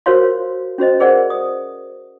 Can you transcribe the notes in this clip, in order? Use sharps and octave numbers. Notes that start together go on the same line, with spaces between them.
F#4 A#4 C5 C#5 F5 C6
C#4 F#4 C5 D#5
G#4 A#4 C5 D5 F#5
D#6